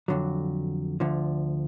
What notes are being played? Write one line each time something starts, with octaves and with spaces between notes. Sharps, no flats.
F2 D3 F#3
D2 D3 F3